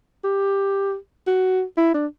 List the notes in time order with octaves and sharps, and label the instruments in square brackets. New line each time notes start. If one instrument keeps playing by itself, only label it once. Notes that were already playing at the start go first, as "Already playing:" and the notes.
[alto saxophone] G4
F#4
E4
D4